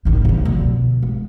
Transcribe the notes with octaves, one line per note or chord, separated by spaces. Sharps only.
G#1 D#3
C3 D#3
F2 D3
B2
G#3